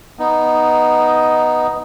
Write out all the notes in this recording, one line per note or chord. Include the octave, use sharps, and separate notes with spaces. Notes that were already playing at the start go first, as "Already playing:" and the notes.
B3 D#4